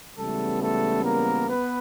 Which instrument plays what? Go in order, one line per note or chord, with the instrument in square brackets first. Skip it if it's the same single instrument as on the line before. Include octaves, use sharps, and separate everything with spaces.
[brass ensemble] C#2 C#3 E3 G3 A3 B3 A4
A3 A4
A#3 A#4
B3 B4